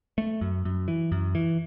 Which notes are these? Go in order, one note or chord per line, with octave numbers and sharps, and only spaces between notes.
A3
F#2
F#2
E3
F#2
E3